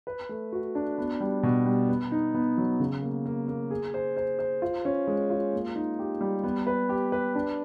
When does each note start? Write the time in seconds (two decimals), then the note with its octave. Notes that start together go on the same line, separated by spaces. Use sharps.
0.07 B4
0.29 A3
0.52 F#4
0.75 D4
0.98 B3
1.20 G3
1.43 B2
1.66 G3
1.89 B3
2.12 D#4
2.35 B3
2.57 F#3
2.80 C#3
3.02 A#3
3.25 A#3
3.48 A#3
3.71 G#4
3.94 C5
4.17 C5
4.39 C5
4.62 F4
4.85 C#4
5.07 G#3
5.30 F4
5.53 A#3
5.75 D#4
5.99 G4
6.21 G3
6.44 B3
6.67 B4
6.89 G4
7.12 B4
7.35 D4